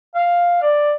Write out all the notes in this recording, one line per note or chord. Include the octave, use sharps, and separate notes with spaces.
F5
D5